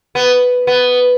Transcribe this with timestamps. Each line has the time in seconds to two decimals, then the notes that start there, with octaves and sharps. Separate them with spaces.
0.15 B3
0.67 B3